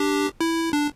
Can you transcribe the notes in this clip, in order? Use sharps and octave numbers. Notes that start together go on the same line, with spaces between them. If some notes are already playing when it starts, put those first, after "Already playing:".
Already playing: D4 G4
E4
D4